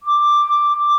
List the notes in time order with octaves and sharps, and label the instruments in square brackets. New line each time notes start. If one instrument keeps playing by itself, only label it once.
[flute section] D6